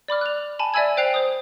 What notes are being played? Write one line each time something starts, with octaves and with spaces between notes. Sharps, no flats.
D5 B5 D6 F6
F#6 F7
G#5 A5 B5
D5 E5 G#5 B5 E6 G#6
C5 G5 F#6 C7 F7
C5 D#6